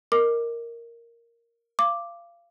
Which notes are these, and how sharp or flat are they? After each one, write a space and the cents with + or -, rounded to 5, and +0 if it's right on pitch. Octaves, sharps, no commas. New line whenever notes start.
A#4 +0 D#5 +0 D6 +10
F5 -25 D6 +0